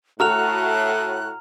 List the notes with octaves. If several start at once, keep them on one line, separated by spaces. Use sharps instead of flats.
A2 F#4 A4 A#5 F6 F#6 F7